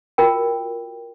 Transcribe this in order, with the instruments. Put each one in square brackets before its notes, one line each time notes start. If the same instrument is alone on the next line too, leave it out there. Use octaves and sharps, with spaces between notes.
[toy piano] F4 F#4 A#4 G5